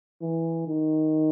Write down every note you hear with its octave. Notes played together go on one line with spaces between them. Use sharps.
E3
D#3